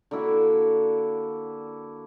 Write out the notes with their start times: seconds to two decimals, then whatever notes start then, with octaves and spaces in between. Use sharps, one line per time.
0.11 D3 A#3 E4 F#4